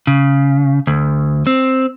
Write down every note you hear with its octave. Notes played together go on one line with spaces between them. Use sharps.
C#3
D2
C4